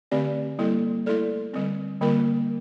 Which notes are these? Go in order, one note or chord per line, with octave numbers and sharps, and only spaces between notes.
D3 A3 C4 G4 D5
G3 A#3 E4 A4
A3 E4 A4 D5
D3 G3 C4
D3 G3 A#3 F4 A#4